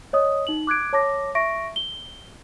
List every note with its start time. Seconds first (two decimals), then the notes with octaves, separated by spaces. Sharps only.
0.13 C#5 D#5 D#6
0.47 D#4 F#7
0.67 D6 F#6 G#6 D7
0.93 C#5 A5 D6 A#6
1.35 E5 C#6 A#6 D7
1.76 G7